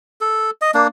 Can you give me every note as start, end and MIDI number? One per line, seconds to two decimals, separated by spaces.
0.21 0.50 69
0.62 0.71 75
0.74 0.87 58
0.74 0.87 62